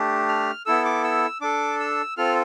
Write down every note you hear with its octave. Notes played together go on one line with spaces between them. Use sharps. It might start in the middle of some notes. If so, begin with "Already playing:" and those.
Already playing: A3 D4 G4
F6
B3 E4 A4 E6
D6
E6
D4 A4 D6
E6
C4 F4 A4 F6